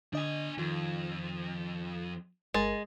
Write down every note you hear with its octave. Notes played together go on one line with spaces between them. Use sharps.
D3 D4 D#5 G#5
F2 D#3 F4
G1 G#3 A#4 A6